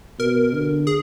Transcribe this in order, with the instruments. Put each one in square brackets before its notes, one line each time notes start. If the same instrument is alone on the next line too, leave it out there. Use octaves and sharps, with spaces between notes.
[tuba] B2 [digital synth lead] A#4
[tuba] D3
[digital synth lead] G#4